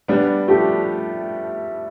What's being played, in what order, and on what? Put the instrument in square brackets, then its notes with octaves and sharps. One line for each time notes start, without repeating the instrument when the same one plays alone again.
[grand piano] G3 B3 [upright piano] D4
[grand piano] F3 A3 [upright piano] G4